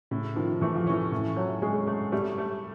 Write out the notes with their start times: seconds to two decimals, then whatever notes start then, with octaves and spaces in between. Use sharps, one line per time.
0.11 A2 C#3
0.36 D#3 F3
0.61 E3 A3
0.75 F3
0.87 E3 C#4
1.12 A2
1.36 F#3 A3
1.62 G#3 C#4
1.87 A3
2.12 G3 A3
2.38 A3